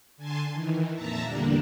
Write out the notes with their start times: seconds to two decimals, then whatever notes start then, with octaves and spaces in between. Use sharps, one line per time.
0.17 D3 G#5 A5 C6
0.53 D#3 E3
0.93 F2 A#2 E5 A5 A#5
1.22 E2 D3 G3 A#3 D4